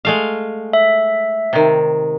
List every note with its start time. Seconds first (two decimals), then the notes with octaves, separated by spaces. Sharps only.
0.05 G#3 A3 F5
0.73 E5
1.53 C3 D#3